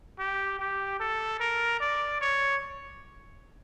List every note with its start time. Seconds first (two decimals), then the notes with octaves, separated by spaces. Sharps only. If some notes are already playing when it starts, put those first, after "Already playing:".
0.19 G4
0.59 G4
1.00 A4
1.40 A#4
1.80 D5
2.21 C#5